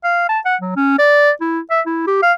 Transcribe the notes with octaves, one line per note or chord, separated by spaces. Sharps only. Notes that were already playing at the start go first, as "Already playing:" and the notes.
F5
A5
F#5
F#3
C#4
D5
E4
E5
E4
G4
F5